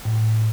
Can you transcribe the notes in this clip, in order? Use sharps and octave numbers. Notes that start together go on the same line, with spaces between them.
A2